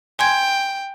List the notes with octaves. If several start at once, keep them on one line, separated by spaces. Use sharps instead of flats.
G5 G#5 C6 G#6